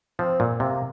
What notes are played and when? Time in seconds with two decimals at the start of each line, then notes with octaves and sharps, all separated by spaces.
0.19 F3 C4
0.40 A#2
0.60 C3 A#3